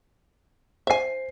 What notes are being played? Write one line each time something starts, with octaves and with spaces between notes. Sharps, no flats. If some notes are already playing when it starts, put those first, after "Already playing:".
C5 E5 G#5 C7